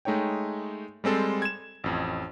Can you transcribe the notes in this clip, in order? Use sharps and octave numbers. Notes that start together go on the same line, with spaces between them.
G#3 A3 D#4 C#5 G5
G3 G#3 C4 A4 C5
G#6 E7
A1 F2